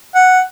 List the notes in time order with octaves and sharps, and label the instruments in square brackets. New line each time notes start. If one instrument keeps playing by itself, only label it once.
[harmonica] F#5